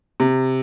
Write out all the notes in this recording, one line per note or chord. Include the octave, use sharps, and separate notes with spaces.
C3